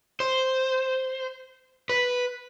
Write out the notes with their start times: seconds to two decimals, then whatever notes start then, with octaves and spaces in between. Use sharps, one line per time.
0.20 C5
1.90 B4